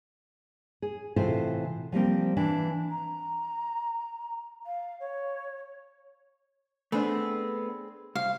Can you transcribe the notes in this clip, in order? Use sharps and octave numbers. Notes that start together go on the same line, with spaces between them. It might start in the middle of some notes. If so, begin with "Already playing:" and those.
G#4
A2 C3 E3 F4 A4 C5
F3 G3 A#3 C4
E3 D4
A#5
F5
C#5
A3 B3 C4 D4 G#4 B4
C2 F5